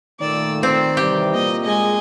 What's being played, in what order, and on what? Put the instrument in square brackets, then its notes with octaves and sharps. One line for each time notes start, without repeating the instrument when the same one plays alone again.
[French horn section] A#2 A3 [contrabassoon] D#3 [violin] D5 E6
[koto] C4 [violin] D5
[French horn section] C3 E3 G3 [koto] G4
[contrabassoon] A#2 [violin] D#5
[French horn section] G#3 [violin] D#5 G#5